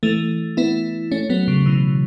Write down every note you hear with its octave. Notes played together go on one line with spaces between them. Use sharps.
E3 A3
B3 E4
A3 C#4
F#3 B3
C#3 F#3
B2 E3